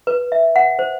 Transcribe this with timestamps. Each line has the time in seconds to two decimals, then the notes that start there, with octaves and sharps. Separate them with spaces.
0.07 B4
0.32 E5
0.56 F#5
0.79 C5